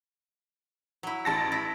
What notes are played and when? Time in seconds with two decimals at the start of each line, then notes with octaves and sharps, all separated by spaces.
1.03 F#3 E4
1.25 A1 A5 A#6
1.52 E4